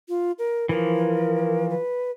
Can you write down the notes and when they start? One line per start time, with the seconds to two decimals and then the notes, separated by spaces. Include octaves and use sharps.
0.09 F4
0.39 A#4
0.69 E3 F3 A#4
1.70 B4